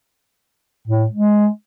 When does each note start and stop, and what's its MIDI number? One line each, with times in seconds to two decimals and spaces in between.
0.88 1.06 45
1.12 1.48 56